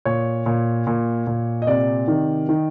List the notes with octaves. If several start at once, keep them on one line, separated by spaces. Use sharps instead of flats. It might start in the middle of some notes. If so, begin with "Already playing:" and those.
A#2 C#5
A#2
A#2
A#2
D#5
C3 D5
D#3
D#3